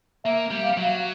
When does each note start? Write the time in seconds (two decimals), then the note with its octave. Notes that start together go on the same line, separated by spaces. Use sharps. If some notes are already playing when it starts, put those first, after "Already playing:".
0.25 A#3 E5
0.51 G3
0.64 F5
0.77 F#3